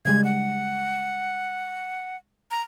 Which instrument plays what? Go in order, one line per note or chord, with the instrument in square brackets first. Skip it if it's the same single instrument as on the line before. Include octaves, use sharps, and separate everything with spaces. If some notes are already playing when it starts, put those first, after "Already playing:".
[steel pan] C#3 G3 G#3 [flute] G#6
[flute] F#5
A#5